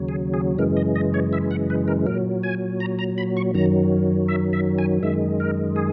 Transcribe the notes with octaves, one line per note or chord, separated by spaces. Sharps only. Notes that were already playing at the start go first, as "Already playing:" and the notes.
Already playing: D#2 C#3 F#3
G#4
G#4
F#2 C#3 E3 G#3 A#4
D#5
D#5
C#5
E5
F#5
B4
A#4
A#2 F#3 A#4
G#5
A#5
A#5
B5
C#6
F#2 D#3 F#3 A#5
E5
E5
G#5
F#2 D#3 G#3 E5
A#4
G#4